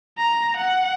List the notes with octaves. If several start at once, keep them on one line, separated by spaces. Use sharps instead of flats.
A#5
F#5